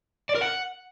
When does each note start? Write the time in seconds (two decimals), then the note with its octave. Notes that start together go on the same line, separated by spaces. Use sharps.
0.29 D5
0.35 A#4
0.41 F#5